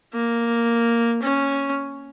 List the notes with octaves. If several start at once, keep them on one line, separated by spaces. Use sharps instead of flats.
A#3
C#4